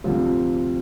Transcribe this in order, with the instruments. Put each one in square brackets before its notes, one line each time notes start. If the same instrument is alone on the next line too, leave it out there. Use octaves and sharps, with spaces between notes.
[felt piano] D2 C3 F3 C4 F4